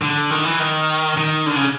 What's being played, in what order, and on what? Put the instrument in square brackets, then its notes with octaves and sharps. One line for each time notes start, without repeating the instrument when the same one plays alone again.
[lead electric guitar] D3
D#3
E3
D#3
D#3
D3
C#3